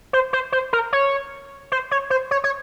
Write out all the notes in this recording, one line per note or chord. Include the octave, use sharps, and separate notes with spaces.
C5
C5
C5
A#4
C#5
C5
C#5
C5
C#5
C#5